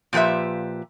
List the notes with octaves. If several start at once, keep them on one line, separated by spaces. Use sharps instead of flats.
A#2 F3 G4 B4 E5